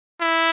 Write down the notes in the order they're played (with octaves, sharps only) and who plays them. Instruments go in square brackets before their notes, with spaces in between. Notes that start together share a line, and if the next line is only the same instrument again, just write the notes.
[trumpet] E4